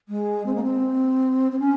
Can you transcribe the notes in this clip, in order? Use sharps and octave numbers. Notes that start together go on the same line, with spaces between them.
G#3
C4
A#3
C4
C4
C#4